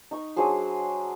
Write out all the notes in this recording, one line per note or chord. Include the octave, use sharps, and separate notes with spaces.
D#4 C#6
F#3 D4 G#4 C5